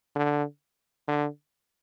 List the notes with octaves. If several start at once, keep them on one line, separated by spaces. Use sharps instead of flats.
D3
D3